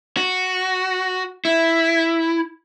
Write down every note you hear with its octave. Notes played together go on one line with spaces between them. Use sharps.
F#4
E4